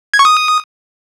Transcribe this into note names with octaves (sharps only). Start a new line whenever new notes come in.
G#6
C#6
D#6